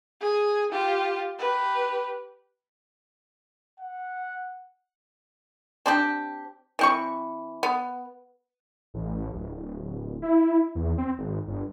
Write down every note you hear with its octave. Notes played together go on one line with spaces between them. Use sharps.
G#4 G#5
F4 G4
G4 B4
F#5
C4 D4 G4
E3 C4 C#6
B3
A1
D1
E4
E2
C4
G#1
G1